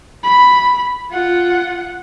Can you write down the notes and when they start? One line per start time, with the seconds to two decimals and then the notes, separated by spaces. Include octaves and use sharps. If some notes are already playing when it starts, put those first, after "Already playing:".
0.23 B5
1.11 F4 F#5